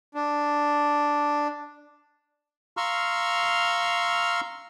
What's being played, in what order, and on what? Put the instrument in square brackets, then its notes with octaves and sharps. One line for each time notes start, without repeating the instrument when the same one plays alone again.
[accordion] D4
[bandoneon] F5 A#5 C6 C#6 E6 F6